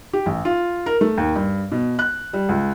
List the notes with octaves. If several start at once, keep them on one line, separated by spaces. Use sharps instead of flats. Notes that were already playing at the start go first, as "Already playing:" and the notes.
G4
A1
F4
A#4
A3
D#2
G2
B2
F#6
G3
C#2